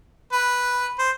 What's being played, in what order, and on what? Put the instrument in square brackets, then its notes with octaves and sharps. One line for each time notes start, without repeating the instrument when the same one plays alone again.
[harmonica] B4
C5